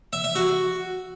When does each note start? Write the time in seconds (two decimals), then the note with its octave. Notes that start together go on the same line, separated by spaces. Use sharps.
0.13 E5
0.24 E5
0.35 F#4